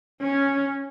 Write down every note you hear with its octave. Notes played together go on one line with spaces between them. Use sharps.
C#4